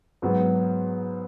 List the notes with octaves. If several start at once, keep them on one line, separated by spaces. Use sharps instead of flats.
G#2 F#3 B3